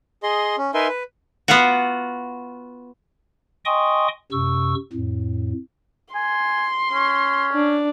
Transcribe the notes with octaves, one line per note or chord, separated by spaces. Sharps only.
G#4 D#5 C6
C#4
D#4 A#4 B4 E5 G#5 C6
B4
B3 F4 F#4
D#5 G5 G#5 C6 C#6 D#6
F#2 C3 C#6 E6
F2 A2
G#5 C6
C#4
D4